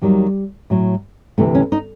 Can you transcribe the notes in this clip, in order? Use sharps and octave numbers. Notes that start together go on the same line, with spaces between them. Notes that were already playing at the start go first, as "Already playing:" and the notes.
D#2 D#3 F#3 G3
A2 F#3
D2 C3 E3 A3
C#4
D#4